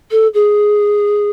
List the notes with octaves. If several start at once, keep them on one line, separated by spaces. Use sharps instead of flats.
A4
G#4